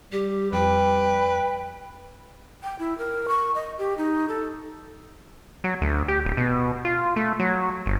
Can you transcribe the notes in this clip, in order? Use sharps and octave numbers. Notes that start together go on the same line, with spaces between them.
G3 G4
F2 B4 G5
G5
E4
A#4
C#6
D#5
G4
D#4
A4
F#3
D2
G4
D1
B2
F4
A3
F#3
G1